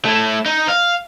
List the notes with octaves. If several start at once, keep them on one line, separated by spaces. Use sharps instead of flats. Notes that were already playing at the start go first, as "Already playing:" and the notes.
A3 E4
D#4
F5